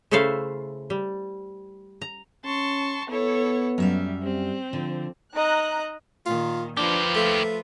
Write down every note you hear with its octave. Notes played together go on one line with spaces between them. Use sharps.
C#3 A3 E4 A4 C5 F5
G3
A#5
C#4 A5 C6 C#6
B3 E4 A4 C#5
F#2 G3 E5 F5
G3 C4
D3 F3
D#4 D#5 A#5 F#6
A#2 D#3 F4
F3 A#3 D4 F4 G4 B4
A3